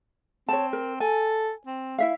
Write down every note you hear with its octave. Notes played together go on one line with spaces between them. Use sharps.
C4 C#5 A5
A#4
A4 G#5
C4
E4 E5 F5